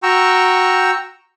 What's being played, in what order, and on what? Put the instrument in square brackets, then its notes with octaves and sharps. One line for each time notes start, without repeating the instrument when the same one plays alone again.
[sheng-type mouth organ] F#4 G5 A#5 C#6 E6